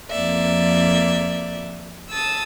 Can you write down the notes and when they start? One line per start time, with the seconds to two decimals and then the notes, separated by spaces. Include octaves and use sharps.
0.11 F2 A#3 D5 E5
2.10 A5 D#6 E6